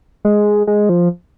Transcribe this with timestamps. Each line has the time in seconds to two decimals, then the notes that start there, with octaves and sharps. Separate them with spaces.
0.25 G#3
0.67 G#3
0.89 F3